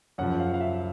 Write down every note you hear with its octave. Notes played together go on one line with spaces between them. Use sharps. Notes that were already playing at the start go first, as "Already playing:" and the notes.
F#2 C#3 F3 F#5
F5
F5
E5